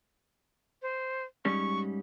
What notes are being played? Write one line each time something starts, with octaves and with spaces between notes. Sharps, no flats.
C5
G#2 G3 C#4 C#6